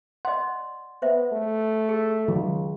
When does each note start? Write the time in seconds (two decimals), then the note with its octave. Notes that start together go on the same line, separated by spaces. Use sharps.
0.25 D5 D#5 F#5 C6
1.02 B3 C5 E5
1.32 A3
1.89 G#4
2.28 C#2 D#3 F#3